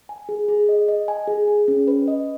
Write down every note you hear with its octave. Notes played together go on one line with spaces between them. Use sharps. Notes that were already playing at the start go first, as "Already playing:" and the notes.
G#5
G#4
G#4
D#5
D#5
G#5
G#4
G#4
C#4
B4
D#5